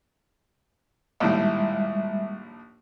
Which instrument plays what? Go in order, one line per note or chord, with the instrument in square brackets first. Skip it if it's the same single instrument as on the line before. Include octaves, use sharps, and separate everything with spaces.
[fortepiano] A#1 D#2 A2 [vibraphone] G3 G#3 E5